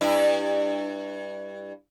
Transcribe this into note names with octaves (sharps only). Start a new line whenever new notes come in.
G2 E4